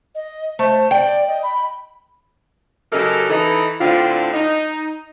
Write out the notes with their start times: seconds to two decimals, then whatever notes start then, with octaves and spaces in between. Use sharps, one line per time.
0.15 D#5
0.59 A3 C5
0.91 D5 G5
1.27 D#5
1.43 B5
2.92 C#3 F#3 D#4 G4 A4 A#4
3.30 E3 D#4 A4
3.81 A2 D3 C4 D4 F4
4.34 D#4